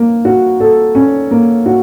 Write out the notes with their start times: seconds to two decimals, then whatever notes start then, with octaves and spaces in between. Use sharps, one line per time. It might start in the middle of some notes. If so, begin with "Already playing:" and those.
Already playing: A#3
0.25 F#4
0.60 A4
0.95 C#4
1.31 A#3
1.66 F#4